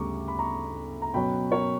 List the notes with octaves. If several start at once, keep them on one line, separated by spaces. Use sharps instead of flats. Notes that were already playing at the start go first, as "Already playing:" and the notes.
Already playing: D2 C#3 G3 A#5 C#6 D6
B5
A#5 C#6
A#5
B2 F#3 C#4 G5 B5
A#4 C#5